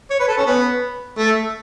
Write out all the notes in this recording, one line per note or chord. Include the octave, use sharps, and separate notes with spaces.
C#5
B4
A4
C#4
B3
A3